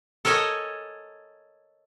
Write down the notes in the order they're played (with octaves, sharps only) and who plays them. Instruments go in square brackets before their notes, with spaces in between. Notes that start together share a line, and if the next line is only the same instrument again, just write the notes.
[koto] A4 A#4 C#5 D#5 G#5